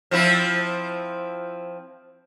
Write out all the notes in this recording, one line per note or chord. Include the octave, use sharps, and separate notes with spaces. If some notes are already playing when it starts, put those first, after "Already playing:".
F3 C4 E4